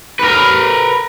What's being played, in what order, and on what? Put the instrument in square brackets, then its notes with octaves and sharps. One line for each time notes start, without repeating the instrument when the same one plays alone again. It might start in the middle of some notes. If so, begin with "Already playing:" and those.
[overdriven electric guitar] A#4 B4